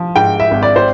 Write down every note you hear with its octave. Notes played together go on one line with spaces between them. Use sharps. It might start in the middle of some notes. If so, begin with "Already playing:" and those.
Already playing: F3
G#2 G5
E5
G#1
D5
C5